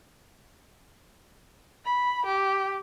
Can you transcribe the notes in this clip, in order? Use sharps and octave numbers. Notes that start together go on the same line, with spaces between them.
B5
G4